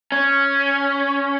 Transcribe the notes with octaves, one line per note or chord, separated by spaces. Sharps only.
C#4